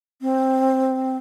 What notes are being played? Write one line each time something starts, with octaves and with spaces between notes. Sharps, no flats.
C4